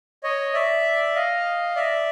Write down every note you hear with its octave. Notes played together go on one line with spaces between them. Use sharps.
C#5 D#5
D5 E5
D#5 F5
D5 E5